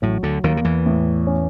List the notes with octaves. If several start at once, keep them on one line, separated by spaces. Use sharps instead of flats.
A1 A2 F#3
D2 D3
D#2 D#3 A#3
D#3
E2 E3
A2
C#4